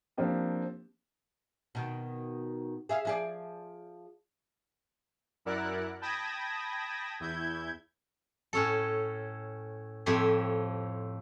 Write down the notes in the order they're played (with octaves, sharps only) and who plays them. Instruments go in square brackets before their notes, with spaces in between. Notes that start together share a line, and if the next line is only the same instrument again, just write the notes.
[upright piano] F3 A#3 C4 D4 G4
[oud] B2 D#3
G#4 E5 F5
F3 G#4 D5
[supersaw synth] F#2 E4 A#4 D5 F#5 F#6
G5 A5 B5 D#6 G#6 A#6
E2 E4 G6 G#6
[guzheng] A2 C#4 A4
F2 A2 F3 G4 E5